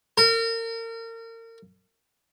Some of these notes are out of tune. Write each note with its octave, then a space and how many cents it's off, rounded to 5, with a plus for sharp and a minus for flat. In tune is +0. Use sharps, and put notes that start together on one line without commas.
A#4 -35